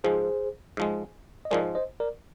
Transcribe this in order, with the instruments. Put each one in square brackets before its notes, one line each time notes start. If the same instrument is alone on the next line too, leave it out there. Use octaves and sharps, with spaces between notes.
[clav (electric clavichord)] G#2 F3 G#3 [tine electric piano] G#4 C5
[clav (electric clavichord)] G#2 F3 G#3
[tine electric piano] D#5
[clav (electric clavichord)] G#2 F3 G#3 [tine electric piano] A#4 D5
[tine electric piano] C5 D#5
A#4 D5